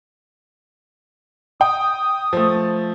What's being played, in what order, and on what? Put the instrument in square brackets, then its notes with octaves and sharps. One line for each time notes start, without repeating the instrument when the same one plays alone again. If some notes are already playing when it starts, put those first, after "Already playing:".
[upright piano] G5 [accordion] D#6
[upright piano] F3 A3